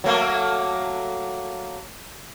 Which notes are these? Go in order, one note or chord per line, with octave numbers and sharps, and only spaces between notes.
F#3 A3 A#3